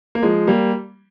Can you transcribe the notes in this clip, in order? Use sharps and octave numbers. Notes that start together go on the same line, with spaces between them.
A#3
F3 G#3
G3 A#3